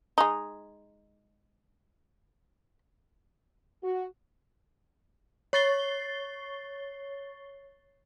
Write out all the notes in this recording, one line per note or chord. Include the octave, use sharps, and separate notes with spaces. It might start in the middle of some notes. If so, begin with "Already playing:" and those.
G#3 D#4
F#4
C#5 C#6 A6 C7 G7